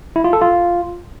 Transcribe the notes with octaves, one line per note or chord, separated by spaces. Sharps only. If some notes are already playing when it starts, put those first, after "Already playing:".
E4
F4
A4
F4